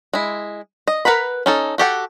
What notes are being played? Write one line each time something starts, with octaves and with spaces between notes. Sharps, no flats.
G#3 E4
D#5
A#4 B4 F#5 A#5 B5
C#4 D#4 A4
F#4 G4 A4 F#5